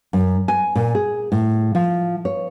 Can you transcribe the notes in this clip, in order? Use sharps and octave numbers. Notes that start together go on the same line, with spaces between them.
F#2
G#5
A#2
G#4
A2
F3
C#5